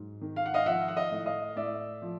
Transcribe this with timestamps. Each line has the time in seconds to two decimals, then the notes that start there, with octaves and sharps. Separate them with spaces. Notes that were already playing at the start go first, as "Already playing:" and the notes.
Already playing: G#2 F#3
0.21 D#3
0.36 F5
0.46 F#5
0.54 D#5 F5
0.66 F3 E5 F#5
0.88 F#5
0.97 D#5 F5
1.11 A2
1.26 D#5 F5
1.56 A2 D5 E5
2.02 F3